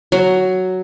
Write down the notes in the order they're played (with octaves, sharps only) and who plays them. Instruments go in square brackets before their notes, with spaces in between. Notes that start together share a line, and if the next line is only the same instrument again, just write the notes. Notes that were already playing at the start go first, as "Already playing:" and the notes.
[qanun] F#3